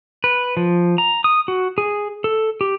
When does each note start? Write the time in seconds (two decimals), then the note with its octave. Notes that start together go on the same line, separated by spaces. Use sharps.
0.24 B4
0.57 F3
0.98 A#5
1.24 D#6
1.48 F#4
1.78 G#4
2.24 A4
2.61 G4